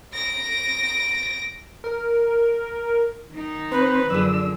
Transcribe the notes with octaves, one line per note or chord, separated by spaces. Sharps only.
A#6 D7
A#4
D#3 D#4
C4 B4 C5
F#2 D3 F3 D4 G#4 E6